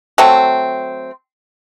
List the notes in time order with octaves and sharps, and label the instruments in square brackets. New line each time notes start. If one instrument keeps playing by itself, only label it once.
[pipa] F#3 A3 C4